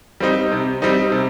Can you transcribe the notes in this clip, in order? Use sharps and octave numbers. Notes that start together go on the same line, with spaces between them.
G3 C4 D#4
C3
G3 C4 D#4
C3